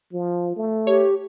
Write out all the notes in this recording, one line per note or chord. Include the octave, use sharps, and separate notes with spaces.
F3
A3
G4 C#5